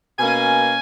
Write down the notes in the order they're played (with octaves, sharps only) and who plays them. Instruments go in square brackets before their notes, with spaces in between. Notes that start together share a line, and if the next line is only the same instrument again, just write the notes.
[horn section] B2 A#3 C#4 G#5